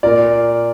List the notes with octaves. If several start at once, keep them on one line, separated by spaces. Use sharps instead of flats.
A#2 A#4 D5